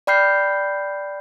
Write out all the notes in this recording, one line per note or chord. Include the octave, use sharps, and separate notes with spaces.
D5 G5 B5 F6 G6 C7